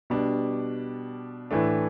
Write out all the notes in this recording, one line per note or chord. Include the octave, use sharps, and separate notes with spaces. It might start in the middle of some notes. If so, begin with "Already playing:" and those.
B2 G3 D4
A2 E3 A3 D4